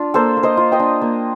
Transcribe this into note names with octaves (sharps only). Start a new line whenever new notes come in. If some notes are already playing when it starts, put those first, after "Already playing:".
Already playing: D4 F4
A#3 A4 C5
A#3
C5 D#5
F4
D#5 G5
D4
A#3